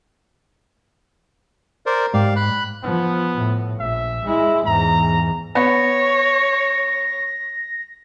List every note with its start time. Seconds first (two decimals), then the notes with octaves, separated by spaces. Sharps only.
1.86 A#4 C5 D5
2.14 G#2 G4 D5 F5
2.36 B5 F#6
2.83 F3 B3
3.34 A2
3.80 A#1 E5
4.25 G#3 E4
4.66 E2 G#2 A#5
5.55 B3 C#5 A#6